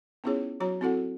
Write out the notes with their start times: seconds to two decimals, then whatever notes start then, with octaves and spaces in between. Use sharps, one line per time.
0.24 B3 C#4 E4 F4 G#4 C#5
0.60 F#3 F#4 C#5 A#5
0.81 C4 E4 F#4 A4 F#5